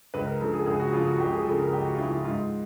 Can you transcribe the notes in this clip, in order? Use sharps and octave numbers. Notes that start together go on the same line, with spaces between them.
C#2 B4
A#4
C#3 F3 A4
G#4
C#2 G#4
F#4
C#3 F3 F4
F#4
C#2 G4
G#4
C#3 F3 A4
A#4
C#2 G4
F#4
F4
C#3 F3 E4
F4
G#2 F4